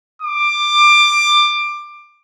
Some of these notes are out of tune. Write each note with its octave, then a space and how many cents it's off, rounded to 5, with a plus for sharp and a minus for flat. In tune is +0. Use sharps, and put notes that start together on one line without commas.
D6 +20